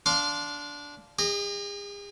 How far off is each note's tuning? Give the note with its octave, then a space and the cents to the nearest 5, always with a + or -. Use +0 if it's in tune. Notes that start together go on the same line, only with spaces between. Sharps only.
D4 -15 F5 +0 C6 +0
G#4 -45 D#5 -10